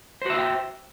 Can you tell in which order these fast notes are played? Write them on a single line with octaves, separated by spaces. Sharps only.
C5 F#4 E5 F5 G5